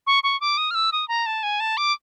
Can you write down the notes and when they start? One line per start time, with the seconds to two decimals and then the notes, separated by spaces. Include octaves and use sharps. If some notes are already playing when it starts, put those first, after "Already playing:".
0.07 C#6
0.23 C#6
0.41 D6
0.57 D#6
0.71 F6
0.75 E6
0.92 D#6
1.08 A#5
1.26 A5
1.43 G#5
1.60 A5
1.77 D6